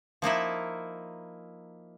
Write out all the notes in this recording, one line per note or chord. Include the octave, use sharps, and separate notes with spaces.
F3 A#3 D#4 E4